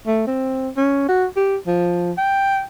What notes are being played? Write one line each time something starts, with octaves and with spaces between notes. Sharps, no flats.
A3
C4
C#4
F#4
G4
F3
G5